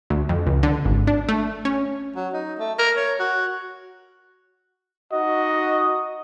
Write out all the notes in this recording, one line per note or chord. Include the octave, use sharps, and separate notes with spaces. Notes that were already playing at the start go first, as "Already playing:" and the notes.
D2
F2
C#2
D3
G#1
D4
A3
C#4
F#3
D#4
A3
A#4
C#5
F#4
D#4 F#4 D#5